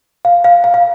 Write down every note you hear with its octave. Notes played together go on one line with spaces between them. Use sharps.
F5
F5
F5
F5